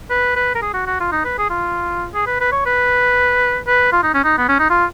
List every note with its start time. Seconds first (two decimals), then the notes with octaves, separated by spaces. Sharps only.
0.10 B4
0.36 B4
0.55 A#4
0.62 G#4
0.74 F#4
0.87 F#4
1.00 F4
1.12 D#4
1.25 B4
1.38 G#4
1.50 F4
2.15 G#4
2.27 B4
2.40 B4
2.52 C#5
2.66 B4
3.67 B4
3.93 F4
4.03 D#4
4.14 C#4
4.24 D#4
4.38 B3
4.49 C#4
4.59 D#4
4.70 F4